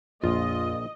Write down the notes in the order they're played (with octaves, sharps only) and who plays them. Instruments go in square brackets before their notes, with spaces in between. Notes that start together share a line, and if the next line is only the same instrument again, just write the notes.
[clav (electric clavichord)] A#1 [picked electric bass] F2 A#3 [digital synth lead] F4 [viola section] D#5